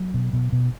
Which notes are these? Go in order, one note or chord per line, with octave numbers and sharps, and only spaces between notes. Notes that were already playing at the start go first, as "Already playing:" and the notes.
Already playing: F#3
B2
B2
B2